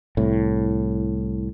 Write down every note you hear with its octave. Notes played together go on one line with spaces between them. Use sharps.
C2 A2